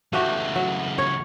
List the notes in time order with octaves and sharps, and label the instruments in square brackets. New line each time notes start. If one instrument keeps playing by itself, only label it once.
[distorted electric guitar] C#2 E3 [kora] A3 F#4 G4
[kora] F#3
C#5